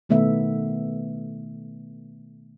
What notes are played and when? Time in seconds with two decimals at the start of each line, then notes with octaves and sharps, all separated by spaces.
0.09 B2 D#3 A3 B3 E5